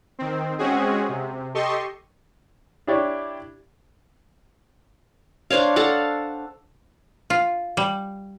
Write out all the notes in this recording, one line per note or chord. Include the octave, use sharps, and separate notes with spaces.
D#3 C4
G#3 C4 C#4 F#4 G#4
C3
G4 A4 D#5 C6 C#6
D4 E4 G4 C#5 D5
D4 C5 C#5 F5
A4 F5 F#5
F4
G3